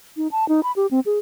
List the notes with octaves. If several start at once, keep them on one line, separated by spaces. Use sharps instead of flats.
D#4
A5
D#4
B5
G4
C4
G#4